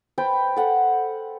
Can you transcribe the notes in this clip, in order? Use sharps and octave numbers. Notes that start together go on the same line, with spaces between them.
B4 C5 G5 A5
A4 F#5